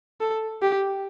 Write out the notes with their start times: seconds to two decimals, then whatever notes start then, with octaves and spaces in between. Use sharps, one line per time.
0.21 A4
0.62 G4